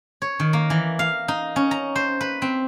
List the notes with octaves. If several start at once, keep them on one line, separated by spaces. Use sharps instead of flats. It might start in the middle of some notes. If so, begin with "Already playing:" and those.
C#5
D#3
A#3
E3
F5
D#4
C#4
A#5
C5
B4
C4